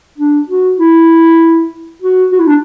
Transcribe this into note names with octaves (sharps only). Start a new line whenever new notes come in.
D4
F#4
E4
F#4
F#4
E4
D4